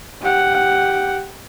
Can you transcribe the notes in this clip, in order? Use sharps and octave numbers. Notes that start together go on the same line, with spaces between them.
G4 F#5